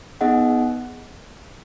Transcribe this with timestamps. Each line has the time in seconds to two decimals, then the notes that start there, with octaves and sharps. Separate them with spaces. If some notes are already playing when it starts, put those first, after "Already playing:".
0.21 B3 D#4 G#4 D#5 F#5